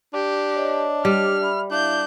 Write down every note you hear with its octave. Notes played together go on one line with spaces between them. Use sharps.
D4 G4
C#5 D#5 A5
G3 F6
E5 B5
D4 E4 E5 F5 G6